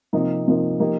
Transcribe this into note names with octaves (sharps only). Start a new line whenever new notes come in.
C3 F3 A#3 D#4
C3 F3 A#3 D#4
F3 A#3 D#4 G4